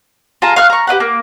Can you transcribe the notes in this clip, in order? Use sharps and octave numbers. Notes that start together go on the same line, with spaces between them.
F4 G#4 A5 A#5
F5 C#6 F6 F#6
A#5 C#6
G4 B4 F5 F#5
A#3